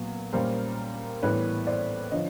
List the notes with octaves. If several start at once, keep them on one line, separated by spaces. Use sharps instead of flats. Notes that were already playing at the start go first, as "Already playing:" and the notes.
Already playing: A#2 F#3 B3
A#2 G3 A#3 C#4 A#4 C5
A2 E3 G3 B3 B4 C#5
C5 D5
D3 F3 C#5 D#5